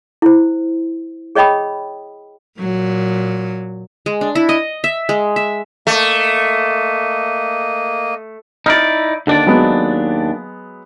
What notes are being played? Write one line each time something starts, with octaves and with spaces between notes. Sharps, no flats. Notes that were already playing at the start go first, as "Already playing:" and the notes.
E4 C5
G#4 C#5 D#5 G5 B5 D#6
A#2 F#3
G#3
D4
E4
D#5
E5
G#3
E5
A3 A#3 D#5
D#4 E4 D5 F6
D#2 D3 D4 D5
F#3 G#3 B3